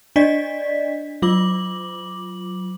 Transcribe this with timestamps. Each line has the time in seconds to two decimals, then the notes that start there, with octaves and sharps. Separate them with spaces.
0.16 D4 D5 D#5 B6
1.22 F#3 F4 D6 F#7